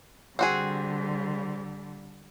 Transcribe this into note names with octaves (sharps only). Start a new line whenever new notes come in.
D3 G3 C4 F#4 G#4